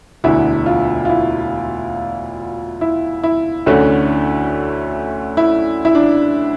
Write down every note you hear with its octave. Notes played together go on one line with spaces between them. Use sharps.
E1 D2 D3 E4
F4
F4
E4
E4
E4
D2 D3 A3 C#4
E4
E4
D4